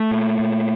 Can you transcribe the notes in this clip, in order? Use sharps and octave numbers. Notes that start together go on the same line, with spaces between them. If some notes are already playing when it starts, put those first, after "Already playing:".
Already playing: A3
A#2
A#2